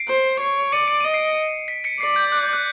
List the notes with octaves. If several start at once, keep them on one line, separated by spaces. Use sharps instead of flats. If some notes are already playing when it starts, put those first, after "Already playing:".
Already playing: C7 D7
C5
C#5
D5 C#7 D#7
D7
D#5 D#7
C7 D7
B6
B6 C#7
D5 C7
G6
F#6
G6
F#6